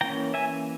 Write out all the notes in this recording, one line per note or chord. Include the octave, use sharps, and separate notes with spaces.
E3 A#3 C#4 G5 A#5
E5 G#5